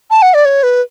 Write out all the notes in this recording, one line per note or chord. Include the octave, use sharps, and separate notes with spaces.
A5
F#5
D5
C#5
B4